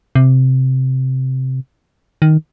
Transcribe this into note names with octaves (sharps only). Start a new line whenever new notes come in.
C3
D#3